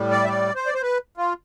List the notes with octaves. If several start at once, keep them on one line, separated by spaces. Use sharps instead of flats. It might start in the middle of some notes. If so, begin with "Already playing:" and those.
Already playing: A2 G3
D5
E5
D5
C5
D5
C5
B4
F4